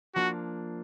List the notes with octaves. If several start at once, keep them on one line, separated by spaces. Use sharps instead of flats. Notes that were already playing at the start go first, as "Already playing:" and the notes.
F3 A#3 D4 F#4